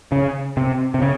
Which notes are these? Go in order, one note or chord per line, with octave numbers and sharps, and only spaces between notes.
C#3
C3
C3
C#3